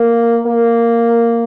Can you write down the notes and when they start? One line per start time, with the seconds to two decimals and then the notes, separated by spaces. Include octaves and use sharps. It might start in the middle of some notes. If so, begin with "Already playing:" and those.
Already playing: A#3
0.46 A#3